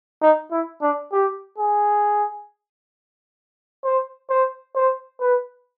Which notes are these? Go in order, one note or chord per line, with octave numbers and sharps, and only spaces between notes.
D#4
E4
D4
G4
G#4
C5
C5
C5
B4